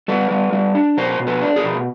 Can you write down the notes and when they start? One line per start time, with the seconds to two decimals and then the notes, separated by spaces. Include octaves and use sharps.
0.08 G3 A4 B4
0.31 G3
0.53 G3
0.75 D4
0.97 B2 A#4 C5
1.19 B2
1.27 A4 B4
1.42 D4
1.56 G#4 A#4
1.64 B2